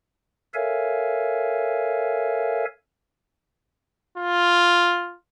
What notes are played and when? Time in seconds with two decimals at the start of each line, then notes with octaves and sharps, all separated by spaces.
0.54 A4 A#4 C#5 E5 F5 G#5
4.18 F4